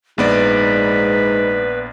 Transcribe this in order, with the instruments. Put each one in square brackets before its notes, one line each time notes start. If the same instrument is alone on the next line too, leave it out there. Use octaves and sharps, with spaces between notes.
[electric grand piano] A#1 B3 D5 [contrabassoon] G#2 [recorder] B4